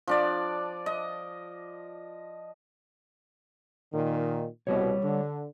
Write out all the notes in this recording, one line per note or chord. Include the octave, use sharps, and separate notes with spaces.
F3 D4 D5
D#5
A#2 D#3
C2 B2 G3 C#5
D3